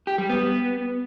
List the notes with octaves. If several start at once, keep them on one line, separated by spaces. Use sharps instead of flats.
G4
G3
B3